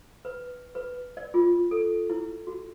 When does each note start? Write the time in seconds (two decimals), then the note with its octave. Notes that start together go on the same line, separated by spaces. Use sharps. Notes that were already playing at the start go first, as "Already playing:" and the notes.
0.25 B4
0.75 B4
1.17 D5
1.34 F4
1.71 A4
2.10 E4
2.47 F#4